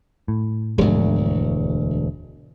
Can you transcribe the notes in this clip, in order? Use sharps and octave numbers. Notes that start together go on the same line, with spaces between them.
A2
E1 D2 G#2 F3 G#3